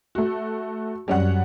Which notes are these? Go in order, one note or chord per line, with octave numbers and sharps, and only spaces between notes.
A3 F#4
F#2 G3 C#4 F#5